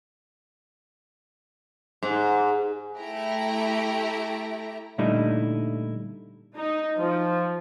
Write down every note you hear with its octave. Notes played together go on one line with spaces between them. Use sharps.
G#2
A3 E4 G4 A#5
A#2 D3 G3 A3 D#4 E4
D#4
F3